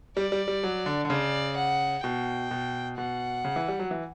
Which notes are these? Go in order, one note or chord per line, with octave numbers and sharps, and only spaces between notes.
G3 D5
G3
G3
F#3
D3
D3
C#3 D5
F#5
B2 G5
B2
B2 F#5
C#3
E3
G3
F#3
E3